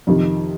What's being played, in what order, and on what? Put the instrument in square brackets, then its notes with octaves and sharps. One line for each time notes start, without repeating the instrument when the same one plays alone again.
[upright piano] F2 C3 D#3